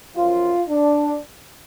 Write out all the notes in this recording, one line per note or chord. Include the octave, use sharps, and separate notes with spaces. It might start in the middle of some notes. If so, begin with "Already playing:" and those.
F#2 F3 F4
D4